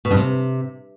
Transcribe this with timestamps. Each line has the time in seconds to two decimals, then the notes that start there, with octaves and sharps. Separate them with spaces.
0.05 B2
0.11 G2
0.16 C3